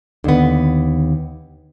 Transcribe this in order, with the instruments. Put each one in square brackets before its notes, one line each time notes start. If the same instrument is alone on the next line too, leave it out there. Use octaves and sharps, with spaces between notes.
[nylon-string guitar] D#2 B3 [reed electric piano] D3